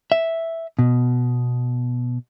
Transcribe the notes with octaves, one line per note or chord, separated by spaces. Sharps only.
E5
B2